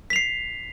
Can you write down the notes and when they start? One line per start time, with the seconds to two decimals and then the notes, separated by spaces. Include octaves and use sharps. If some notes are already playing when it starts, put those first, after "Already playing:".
0.10 B6
0.13 F7
0.16 C7